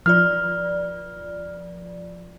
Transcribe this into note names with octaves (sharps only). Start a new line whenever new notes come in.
F3 F4 D5 F6